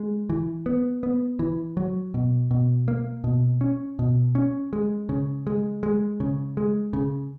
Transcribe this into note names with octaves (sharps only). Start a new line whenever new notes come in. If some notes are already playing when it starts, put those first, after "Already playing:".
Already playing: G#3
E3
B3
B3
E3
F#3
B2
B2
A#3
B2
C#4
B2
C#4
G#3
C#3
G#3
G#3
C#3
G#3
C#3